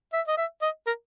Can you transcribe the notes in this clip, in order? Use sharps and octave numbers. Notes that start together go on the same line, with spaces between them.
E5
D#5
E5
D#5
A#4